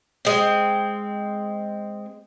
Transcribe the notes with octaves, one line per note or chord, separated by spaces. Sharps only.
G#3 C4